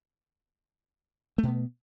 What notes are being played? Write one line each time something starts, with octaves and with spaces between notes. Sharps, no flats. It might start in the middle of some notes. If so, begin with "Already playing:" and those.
B2 A3 B3